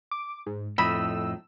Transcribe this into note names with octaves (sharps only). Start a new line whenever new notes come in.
D6
G#2
F2 A2 D#4 B5 E6